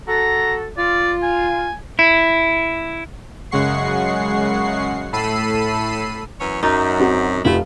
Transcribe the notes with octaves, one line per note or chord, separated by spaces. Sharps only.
F#4 A4 A#5
F4 D5
G#5
E4
F#2 C#3 G#3 F#5 C#6 C7
A2 A4 B5 E6 C7 D#7
F#2 E3 C#5
F#2 D#4
C4 F#4
F1 A3 B3 E4 F4 G4